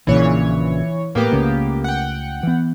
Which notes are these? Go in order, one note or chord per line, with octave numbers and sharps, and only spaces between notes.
A#1 A#2 C#3 E3 C#5
A2 A#3 B3 G4
C#2 C#3 A3
F#5 G5
E3 B3